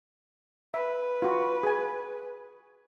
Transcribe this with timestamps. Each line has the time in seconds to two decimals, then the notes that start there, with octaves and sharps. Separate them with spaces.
0.74 B4 E5
1.22 F4 F#4
1.63 G#4 G#5